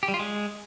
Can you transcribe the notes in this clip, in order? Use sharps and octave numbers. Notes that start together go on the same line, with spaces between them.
G4
G3
F4
G#3